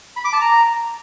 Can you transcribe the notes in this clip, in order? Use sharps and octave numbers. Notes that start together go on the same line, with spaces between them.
B5
D6
A5
A#5